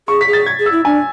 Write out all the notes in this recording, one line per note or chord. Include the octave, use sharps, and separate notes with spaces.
G#4 C#6
B6
G#4
A6
G#6
G#4
E6
E4
D4 G#5